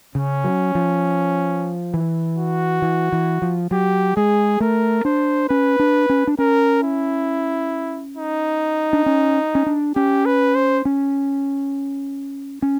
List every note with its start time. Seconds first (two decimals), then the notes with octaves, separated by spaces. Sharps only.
0.15 C#3 C#4
0.44 F#3
0.75 F3
1.94 E3
2.38 F#4
2.82 E3
3.12 E3
3.42 F3
3.71 F#3 G4
4.17 G#3 G#4
4.60 A3 A#4
5.05 D4 C5
5.49 C#4 B4
5.80 D4
6.10 C#4
6.27 D4
6.39 C#4 A#4
6.83 E4
8.17 D#4
8.93 D4
9.06 C#4
9.55 C#4
9.66 D4
9.96 C#4 G4
10.25 B4
10.55 C5
10.85 C#4
12.62 C#4